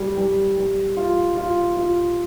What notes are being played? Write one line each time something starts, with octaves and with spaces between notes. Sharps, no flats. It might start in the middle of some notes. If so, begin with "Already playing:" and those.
Already playing: G3
G3
G3
F4
F4
F4